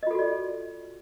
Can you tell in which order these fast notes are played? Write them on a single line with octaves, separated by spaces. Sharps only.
D#5 F4 A4 F#4 D5